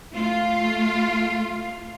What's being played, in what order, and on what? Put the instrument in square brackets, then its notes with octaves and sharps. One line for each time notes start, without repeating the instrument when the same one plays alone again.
[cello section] A3 F4